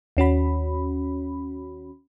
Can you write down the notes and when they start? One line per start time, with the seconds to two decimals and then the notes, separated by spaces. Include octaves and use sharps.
0.17 D#2 C#4 F#4 B5